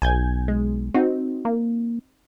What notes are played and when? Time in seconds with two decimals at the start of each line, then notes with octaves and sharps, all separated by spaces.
0.02 B1 G#5 G6 G#6
0.48 G#3
0.95 C4 D#4 F#4
1.45 A#3